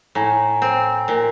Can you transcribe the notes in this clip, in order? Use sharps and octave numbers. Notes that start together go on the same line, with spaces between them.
A2 G#5 A#5
C4
A#2